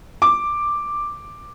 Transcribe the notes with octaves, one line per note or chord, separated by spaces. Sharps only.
D6